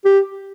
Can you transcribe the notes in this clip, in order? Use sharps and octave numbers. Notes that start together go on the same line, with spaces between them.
G4